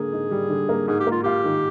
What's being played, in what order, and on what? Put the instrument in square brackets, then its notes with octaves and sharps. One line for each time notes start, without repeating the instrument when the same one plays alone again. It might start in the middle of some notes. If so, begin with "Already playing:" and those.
Already playing: [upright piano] D3 A#3 [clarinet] G#4
[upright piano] D#4
G3
D3
A#3
[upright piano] G#2 [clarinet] G#4
[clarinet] G4
[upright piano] A#3 [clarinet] F4
[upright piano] F4 [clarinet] G4
[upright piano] D#3